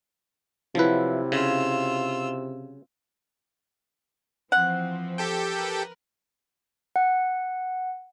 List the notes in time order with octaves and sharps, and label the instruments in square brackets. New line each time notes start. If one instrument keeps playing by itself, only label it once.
[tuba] C3 [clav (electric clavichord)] F3 B4 [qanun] F#3 E4 A#5
[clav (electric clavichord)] C#3 [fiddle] F4 E6
[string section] E3 F3 C4 [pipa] F#5
[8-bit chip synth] G4 A4 G5
[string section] A#4 B4
[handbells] F#5